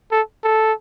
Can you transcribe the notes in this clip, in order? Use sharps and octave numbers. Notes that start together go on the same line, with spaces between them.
A4
A4